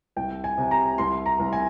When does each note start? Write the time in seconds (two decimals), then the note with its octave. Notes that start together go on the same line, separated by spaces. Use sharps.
0.16 C2 G5
0.44 G#5
0.58 C3
0.71 A#5
0.98 C2 C6
1.26 A#5
1.39 C2
1.53 G#5